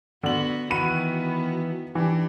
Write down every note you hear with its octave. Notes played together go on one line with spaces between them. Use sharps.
D3 B3 F#4 F#7
D#3 E3 B3 F#4 B5 D#7
E3 D4 G4